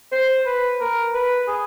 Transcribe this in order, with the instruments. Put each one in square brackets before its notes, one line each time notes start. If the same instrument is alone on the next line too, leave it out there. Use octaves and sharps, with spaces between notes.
[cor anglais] C5
B4
A#4
B4
G#4